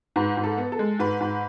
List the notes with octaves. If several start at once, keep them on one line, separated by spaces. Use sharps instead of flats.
G#2 B4
G#2
A4
B3
A4
G#3
G#2 B4
G#2